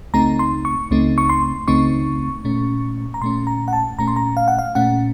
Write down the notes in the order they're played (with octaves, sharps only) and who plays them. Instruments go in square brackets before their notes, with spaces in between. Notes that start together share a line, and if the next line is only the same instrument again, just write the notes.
[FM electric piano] C#2 C#3 A3 C4 D#4 A#5
C6
C#6
C#2 C#3 A3 C4 D#4
C#6
C6
C#2 C#3 A3 C4 D#4 C#6
A#2 A3 C#4
A#5
A#2 A3 C#4 C6
A#5
F#5
A5
A#2 A3 C#4 A#5
C6
A#5
F5
F#5
F5
A#2 A3 C#4 F#5